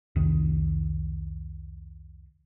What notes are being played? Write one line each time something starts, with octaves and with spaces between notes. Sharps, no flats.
C2 F2 D#3